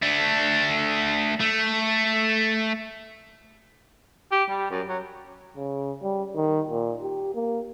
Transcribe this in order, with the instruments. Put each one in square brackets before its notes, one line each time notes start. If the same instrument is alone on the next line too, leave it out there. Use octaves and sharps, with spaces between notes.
[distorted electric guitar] A3 D4
A3
[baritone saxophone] G4
G3
F#2
F#3
[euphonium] C#3
G3
D#3
A#2
G4
A#3